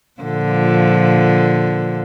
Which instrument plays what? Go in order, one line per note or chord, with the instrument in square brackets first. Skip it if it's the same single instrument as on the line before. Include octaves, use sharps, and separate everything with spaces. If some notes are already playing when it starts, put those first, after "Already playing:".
[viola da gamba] A#2 D3 F3